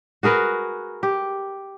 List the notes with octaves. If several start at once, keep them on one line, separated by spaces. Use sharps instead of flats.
F#4 G#4 A#4 B4
G4